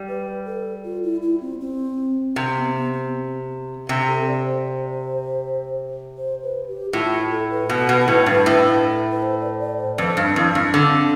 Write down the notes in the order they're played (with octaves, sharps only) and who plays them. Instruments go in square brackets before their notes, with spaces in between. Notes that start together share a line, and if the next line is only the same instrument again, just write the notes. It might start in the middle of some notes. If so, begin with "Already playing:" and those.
Already playing: [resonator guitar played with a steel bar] G3
[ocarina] B4
A4
F4
E4
E4
C4
C4
[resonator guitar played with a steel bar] C3 [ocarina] C4
[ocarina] B3
B3
C4
[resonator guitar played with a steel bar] C3
[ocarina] A4
D5
C5
C5
B4
G4
[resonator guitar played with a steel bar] A2 [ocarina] F4
[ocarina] F4
A4
B4
[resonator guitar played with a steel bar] B2
B2
A2
G2
A2
[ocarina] B4
C5
D5
D5
C5
[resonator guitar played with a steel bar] F2 [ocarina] B4
[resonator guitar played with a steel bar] G2 [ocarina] D4
[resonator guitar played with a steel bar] F2 [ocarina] E4
[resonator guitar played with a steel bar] G2 [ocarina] C4
[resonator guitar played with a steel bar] D3